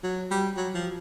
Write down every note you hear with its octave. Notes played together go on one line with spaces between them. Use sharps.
F#3
G3
F#3
F3